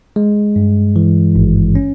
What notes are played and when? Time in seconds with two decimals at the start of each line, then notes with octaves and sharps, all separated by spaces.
0.16 G#3
0.56 G2
0.96 E3
1.36 G#1
1.75 C#4